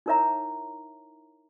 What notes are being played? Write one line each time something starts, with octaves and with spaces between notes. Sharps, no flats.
D#4 E4 A#4 C#5 E5 A#5